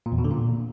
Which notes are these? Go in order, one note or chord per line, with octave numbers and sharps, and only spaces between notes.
A#2
E2
B2
D3
A#2